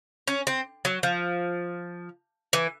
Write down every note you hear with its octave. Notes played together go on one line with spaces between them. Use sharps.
C#4
C4
F#3
F3
E3